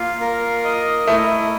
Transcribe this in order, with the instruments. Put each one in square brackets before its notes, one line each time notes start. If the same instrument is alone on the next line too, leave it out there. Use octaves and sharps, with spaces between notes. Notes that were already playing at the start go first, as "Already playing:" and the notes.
Already playing: [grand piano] A#3 [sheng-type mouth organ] F4
[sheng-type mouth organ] A#4
D#5
[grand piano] A3 [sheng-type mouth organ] E4